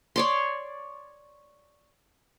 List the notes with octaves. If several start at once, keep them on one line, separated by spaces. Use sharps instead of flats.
C#5 D5 C6